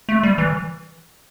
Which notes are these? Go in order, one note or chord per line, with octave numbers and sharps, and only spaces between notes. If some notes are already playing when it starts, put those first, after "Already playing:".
A3
G3
E3